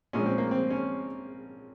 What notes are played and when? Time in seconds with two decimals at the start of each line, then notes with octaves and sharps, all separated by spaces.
0.13 A#1 A#2 G#3 C#4
0.26 C4
0.38 A#3
0.51 C4
0.70 C#4